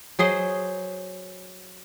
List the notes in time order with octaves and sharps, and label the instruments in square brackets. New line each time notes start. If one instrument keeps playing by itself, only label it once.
[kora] F#3 G#4 C5 D#5